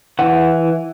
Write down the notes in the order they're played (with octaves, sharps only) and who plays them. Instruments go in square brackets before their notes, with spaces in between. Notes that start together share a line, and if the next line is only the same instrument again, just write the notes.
[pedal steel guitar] E3 F#5